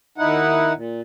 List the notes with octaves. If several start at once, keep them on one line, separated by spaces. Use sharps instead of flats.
D#2 D#4 E4 F#5
A#2